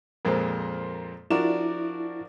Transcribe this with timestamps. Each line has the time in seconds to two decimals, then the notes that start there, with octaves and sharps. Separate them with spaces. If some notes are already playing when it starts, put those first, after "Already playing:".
0.25 F2 A#2 G#3 A#4 C5
1.30 F3 D4 E4 F#4 A#4 D5 E7